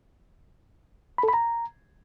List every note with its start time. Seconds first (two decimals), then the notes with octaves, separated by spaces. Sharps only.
1.18 B5
1.23 A4
1.28 B5
1.33 A#5